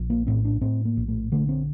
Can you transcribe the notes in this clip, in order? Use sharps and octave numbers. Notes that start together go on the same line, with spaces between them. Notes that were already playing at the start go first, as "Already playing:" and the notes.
Already playing: A#1
A#3
A2 C4
D4
A2 C4
A#3
A#1
A3
D3 A3
C4